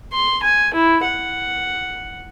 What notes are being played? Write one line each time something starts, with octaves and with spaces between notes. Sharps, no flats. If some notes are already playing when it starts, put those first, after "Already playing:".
C6
G#5
E4
F#5